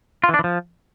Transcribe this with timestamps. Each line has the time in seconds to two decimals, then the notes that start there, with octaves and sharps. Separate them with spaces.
0.24 F4
0.29 E3
0.34 D4
0.39 E3
0.44 F3